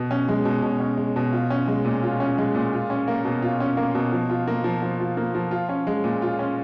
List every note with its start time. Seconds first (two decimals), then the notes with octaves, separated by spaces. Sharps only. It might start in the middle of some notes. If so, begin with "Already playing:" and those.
Already playing: B2
0.11 C#4
0.28 G#3
0.45 B2
0.63 B2
0.80 C#4
0.97 G#3
1.16 B2
1.33 F4
1.50 C#4
1.68 G#3
1.85 A#2
2.03 F4
2.20 C#4
2.38 G#3
2.55 A#2
2.73 F4
2.90 C#4
3.08 A#3
3.25 B2
3.42 F4
3.60 C#4
3.77 A#3
3.95 B2
4.12 F3
4.30 F4
4.48 A#3
4.64 F3
4.82 F3
5.00 F4
5.17 A#3
5.35 F3
5.51 F4
5.69 C#4
5.87 G#3
6.04 A#2
6.22 F4
6.39 C#4